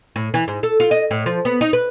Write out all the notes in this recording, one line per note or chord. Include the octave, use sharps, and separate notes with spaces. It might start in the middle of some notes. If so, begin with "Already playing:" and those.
A2
E3
G#2
A4
F4
D#5
A2
F3
B3
D#4
B4